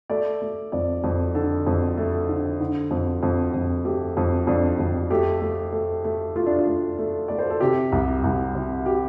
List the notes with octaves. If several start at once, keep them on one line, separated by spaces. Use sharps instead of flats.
A3 D5
A3
F2 D5
F2
D3 A4
F2
A3
D3
D3
F2
F2
F2
A3 G4
F2
F2 D4
F2
A3 G4
A3
A3
A3
A3 F4
D4
F4
A3
A3
A3 D5
C5
A4
C3 G4
C2
C2
C3
G4